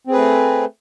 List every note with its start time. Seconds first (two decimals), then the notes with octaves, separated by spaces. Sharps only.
0.07 C4
0.10 G#4
0.13 B4
0.16 A3